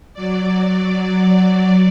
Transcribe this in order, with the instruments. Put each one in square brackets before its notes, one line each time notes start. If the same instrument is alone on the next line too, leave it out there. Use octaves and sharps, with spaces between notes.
[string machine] F#3 D5